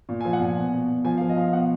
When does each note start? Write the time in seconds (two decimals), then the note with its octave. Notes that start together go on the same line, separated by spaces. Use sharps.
0.09 A#2
0.21 G#5
0.25 F3
0.33 F#5
0.40 A#2 G#5
0.57 B2
0.73 B2
0.89 B2
1.04 F3 G#5
1.18 F5
1.21 F3
1.29 D#5
1.37 F3 F5
1.53 B2 F#5